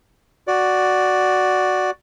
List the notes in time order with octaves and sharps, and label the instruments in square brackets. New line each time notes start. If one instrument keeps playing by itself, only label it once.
[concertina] F#4 D5